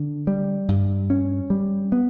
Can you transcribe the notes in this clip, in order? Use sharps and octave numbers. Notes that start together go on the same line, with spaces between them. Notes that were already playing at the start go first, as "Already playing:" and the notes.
Already playing: D3
G3
G2
C#4
G3
B3